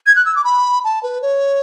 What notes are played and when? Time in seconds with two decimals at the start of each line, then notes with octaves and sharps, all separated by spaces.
0.06 G#6
0.16 F#6
0.26 E6
0.36 D6
0.44 B5
0.84 A5
1.03 B4
1.22 C#5